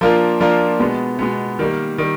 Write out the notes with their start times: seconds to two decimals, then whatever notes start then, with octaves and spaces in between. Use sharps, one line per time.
0.01 F3 A#3 D4 F4 A#4
0.40 F3 A#3 D4 F4 A#4
0.80 B2 G#3 B3
1.19 B2 G#3 B3
1.59 D#3 G3 A#3
1.98 D#3 G3